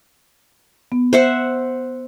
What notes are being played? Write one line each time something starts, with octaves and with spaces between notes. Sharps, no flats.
B3
C5 E5 F#5